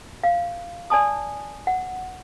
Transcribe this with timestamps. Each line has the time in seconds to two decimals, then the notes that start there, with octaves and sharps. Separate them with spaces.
0.23 F5
0.90 D5 G#5 A5 D#6
1.67 F#5